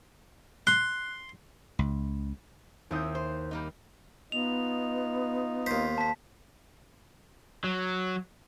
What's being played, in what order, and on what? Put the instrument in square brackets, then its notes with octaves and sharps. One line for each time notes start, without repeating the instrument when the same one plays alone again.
[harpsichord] C6 [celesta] F#6
[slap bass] C#2
[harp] D#2 D#6 G6 [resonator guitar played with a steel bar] C4 E4
[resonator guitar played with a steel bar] C5
G3 A#3 D#4
[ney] B3 [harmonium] D#4 F4 D#5 [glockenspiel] F7
[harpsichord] D#2 C5 [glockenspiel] B6
[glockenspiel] A5 B6
[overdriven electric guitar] F#3